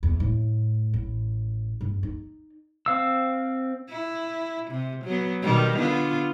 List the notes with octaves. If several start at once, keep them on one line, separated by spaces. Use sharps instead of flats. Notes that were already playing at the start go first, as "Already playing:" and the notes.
E2
A2
A1
G2
D#4
C4 F5 E6
E4
C3
F#3 B3
B2 D#3 G3
D3 B3 F4